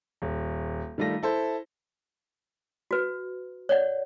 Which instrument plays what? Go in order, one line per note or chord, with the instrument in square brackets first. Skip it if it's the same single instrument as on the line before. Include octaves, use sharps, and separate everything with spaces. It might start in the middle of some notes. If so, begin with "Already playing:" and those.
[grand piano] D#1
D#3 G3 A3 F4 A#6
E4 A4 C5
[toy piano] F#4 B4
C#5 D5 F#5